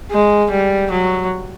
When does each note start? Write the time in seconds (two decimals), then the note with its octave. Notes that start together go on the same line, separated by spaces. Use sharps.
0.11 G#3
0.51 G3
0.90 F#3